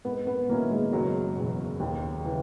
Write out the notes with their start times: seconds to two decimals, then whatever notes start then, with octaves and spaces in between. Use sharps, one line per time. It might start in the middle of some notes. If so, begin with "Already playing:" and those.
0.05 G#2 B3
0.27 B3
0.49 D#3 F#3 A#3 C#4 E4
0.71 G#3
0.93 F#1 F#3
1.36 E2 B2
1.80 D#2
2.24 C#3 E3